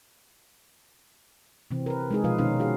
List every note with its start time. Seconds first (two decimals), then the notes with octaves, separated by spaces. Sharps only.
1.71 C3 E3 C4
1.86 A#4 B4
2.11 G#3 D#4 G#4
2.24 B2 F3 F4 B4 F5
2.38 B2 D#3 C4 C#4 D#4 F5
2.60 F#4 G#4 F5